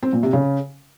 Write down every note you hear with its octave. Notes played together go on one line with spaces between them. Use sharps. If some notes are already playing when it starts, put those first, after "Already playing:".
C4
A#2
C3
C#3